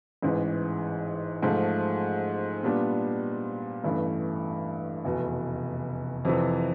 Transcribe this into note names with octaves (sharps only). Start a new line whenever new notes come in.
A1 G#2 E3
G#2 F3 A3
A#2 G3 B3 D4
A1 G2 E3 A3
F1 E2 B2
F2 C3 E3